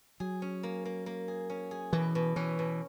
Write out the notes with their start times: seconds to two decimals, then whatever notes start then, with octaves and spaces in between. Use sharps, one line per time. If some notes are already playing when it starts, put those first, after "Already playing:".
0.20 F#3 G#4
0.42 C#4
0.63 A#3
0.85 A#3
1.06 A#3
1.28 G#4
1.50 C#4
1.71 G#4
1.93 B2 E3
2.15 B2
2.36 E3 C#4
2.59 B2